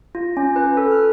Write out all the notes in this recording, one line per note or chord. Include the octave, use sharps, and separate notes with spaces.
F4
C#4
B4
A4
F6